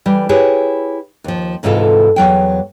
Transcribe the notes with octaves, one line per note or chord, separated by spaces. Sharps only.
E3 G3
E4 G4 G#4 B4 C#5
D#2 F3
D2 G#2 C3 E3 F4 A4
E2 F#3 G5